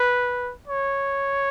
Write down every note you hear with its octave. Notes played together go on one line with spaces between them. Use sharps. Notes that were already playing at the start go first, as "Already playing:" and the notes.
Already playing: B4
C#5